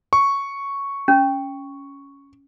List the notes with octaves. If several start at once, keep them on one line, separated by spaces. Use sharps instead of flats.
C#6
C#4